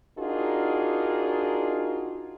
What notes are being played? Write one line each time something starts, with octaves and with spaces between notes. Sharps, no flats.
D4 D#4 F4 F#4 G#4 A#4